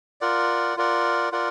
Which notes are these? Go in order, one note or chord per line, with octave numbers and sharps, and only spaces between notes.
F4 A#4 D5 F#5
F4 A#4 D5 F#5
F4 A#4 D5 F#5